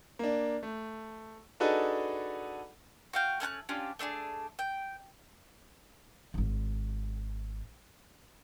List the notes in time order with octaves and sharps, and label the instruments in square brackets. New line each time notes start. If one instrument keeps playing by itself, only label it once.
[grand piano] A#3 D4
A3
D4 D#4 F#4 G#4 A4 B4
[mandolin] F#4 F5 G5
A3 C#4 A5 F#6
C#4 D4 F4 G4
A3 D4 F#4 G#4
G5
[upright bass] D1 G#1